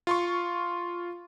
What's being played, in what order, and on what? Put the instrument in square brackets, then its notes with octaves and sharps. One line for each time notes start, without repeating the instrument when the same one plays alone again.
[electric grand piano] F4 C6 C#6